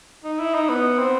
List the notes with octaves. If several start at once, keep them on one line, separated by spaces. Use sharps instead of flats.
D#4
E4
D#4
B3
C4